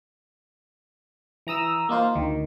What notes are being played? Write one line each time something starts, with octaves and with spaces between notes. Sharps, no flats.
E3 A#5 D#6 E6
A#3 D#4 F4 C5
D2 D#3